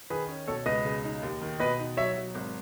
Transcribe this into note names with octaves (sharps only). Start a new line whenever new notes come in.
D#3 G#4 B4
C#4
B2 A4 C#5
C#2 B4 D#5
C#3
D#4
D#2
D#3
B2 B4 D#5
D#4
F#3 C#5 E5
F#3
G#1